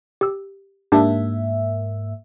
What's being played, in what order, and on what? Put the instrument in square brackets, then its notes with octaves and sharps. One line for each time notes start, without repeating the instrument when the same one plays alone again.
[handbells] G4 E6
[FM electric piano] G#2 A#3 E5 [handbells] D4 G4 A5